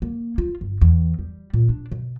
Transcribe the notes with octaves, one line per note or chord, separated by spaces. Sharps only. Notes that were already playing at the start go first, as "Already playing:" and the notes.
A#3
F4
G1
E2
G3
A#2
D4
B2